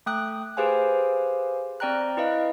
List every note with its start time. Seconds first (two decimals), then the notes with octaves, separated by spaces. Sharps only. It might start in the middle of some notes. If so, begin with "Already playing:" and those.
0.06 A3 G5 D#6 F#6
0.57 G4 G#4 B4 C5 F5 G#5
1.80 C4 D5 G5 A#5 F#6
2.17 E4 B4 D#5 F5